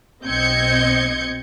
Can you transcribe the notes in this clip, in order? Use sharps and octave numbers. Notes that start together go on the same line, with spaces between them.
B1 C4 D#5 G6 G#6 C#7